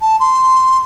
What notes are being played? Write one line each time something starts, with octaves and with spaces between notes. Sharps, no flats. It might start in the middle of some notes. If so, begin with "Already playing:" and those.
A5
C6